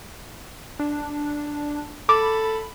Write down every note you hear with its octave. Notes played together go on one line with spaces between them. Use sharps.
D4
A4 B5 D6